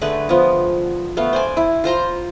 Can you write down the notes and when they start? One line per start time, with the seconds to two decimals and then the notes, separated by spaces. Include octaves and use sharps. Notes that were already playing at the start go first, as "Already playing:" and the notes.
0.01 D3 A3 G#4 B4
0.29 F3 B3
1.17 A3 B3 F5
1.33 C5 D5 G#5
1.57 E4
1.84 F4 C5 A#5 C6